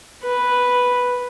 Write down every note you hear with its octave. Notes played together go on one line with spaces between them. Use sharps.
B4